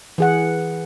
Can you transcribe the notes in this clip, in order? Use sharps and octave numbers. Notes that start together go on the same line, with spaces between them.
E3 G#4 F#5